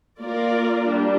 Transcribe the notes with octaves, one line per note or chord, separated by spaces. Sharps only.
A#3 F4 A#4 D5
G3 D4